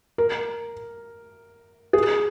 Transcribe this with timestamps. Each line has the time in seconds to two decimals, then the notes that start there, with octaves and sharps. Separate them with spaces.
0.18 A#4
1.93 G#4